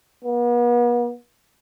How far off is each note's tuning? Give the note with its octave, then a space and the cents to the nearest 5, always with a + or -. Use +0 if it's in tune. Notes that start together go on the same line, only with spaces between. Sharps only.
B3 -40